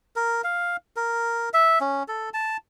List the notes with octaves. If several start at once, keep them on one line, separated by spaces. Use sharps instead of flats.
A#4
F5
A#4
E5
C#4
A4
A5